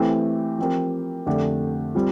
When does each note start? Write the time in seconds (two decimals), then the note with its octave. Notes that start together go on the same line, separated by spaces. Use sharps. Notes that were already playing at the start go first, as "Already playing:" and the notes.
Already playing: E3 A3 C4 E4 G4
0.58 F3 C4 G4 A#4
1.26 F2 D3 A3 D4 G4
1.95 G3 C4 F4